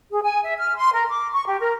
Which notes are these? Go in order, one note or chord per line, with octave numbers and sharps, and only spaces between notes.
G#4
G#5
E5
F6
C6
A#4
D6
C#6
G4
A#4